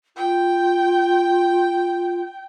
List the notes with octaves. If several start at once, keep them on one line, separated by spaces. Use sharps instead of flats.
F4 G5